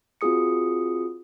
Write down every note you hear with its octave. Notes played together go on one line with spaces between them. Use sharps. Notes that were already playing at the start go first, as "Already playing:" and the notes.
C4 F4 F#4 G#4 D#6 C#7